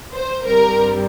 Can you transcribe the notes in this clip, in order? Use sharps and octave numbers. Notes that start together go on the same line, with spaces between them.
C5
G2 G3 C4 A#4